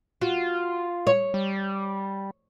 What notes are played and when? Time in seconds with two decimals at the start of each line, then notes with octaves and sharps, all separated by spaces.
0.21 F4 F#4
1.07 C#5
1.34 G3